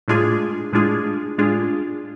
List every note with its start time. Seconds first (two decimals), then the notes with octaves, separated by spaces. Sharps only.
0.08 A2 G#3 D4 F4 G#4
0.73 A2 G#3 D4 F4 G#4
1.38 A2 G#3 D4 F4 G#4